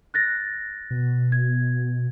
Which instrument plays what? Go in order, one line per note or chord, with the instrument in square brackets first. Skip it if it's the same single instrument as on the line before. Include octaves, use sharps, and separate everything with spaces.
[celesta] F#6 A6 A#6
[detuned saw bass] B2
[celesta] G#6